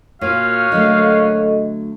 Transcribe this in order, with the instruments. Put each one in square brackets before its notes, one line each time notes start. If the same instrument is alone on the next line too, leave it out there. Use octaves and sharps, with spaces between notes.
[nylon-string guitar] A#2 [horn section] A#3 C#4 F#4 [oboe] F5
[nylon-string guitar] D3 F#3 A3 [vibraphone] A4 D#5